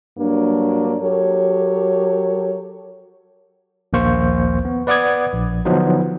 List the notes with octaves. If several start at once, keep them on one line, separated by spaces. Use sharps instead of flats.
G2 F#3 A#3 D4
F#3 G4 A4 A#4 C#5
A#1 D#2 A#3 C5 C#6
B3
B4 D5 F#5 D6 D#6 G#6
A#1
D3 F3 F#3 B3 D#4 C5